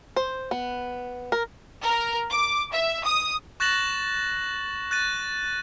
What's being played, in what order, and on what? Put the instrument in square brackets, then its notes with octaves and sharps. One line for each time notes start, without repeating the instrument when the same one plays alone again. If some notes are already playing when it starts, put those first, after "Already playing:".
[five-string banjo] C5
B3
A#4
[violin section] A#4
D6
E5
D#6
[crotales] C#6 F#6 A6 A#6 E7 F#7
F#6 A6 D#7